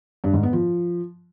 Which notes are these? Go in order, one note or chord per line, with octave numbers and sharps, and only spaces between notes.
G2
G#2
B3
F3